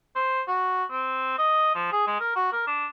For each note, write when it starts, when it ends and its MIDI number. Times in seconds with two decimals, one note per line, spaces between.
0.16 0.42 72
0.48 0.84 66
0.90 1.35 60
1.39 1.74 75
1.75 1.92 53
1.92 2.05 68
2.07 2.19 56
2.20 2.34 70
2.36 2.50 66
2.52 2.63 70
2.67 2.87 62